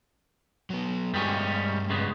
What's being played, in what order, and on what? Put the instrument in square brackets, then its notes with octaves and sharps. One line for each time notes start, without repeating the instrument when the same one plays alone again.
[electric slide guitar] F#3 B3
[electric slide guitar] G2 G4 G#4 [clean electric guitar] G3 G#3 C#4
[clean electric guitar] C#3 G#3 B3